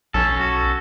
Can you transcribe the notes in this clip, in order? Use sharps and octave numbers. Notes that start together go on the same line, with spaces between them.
B1 C#4 A4
F#4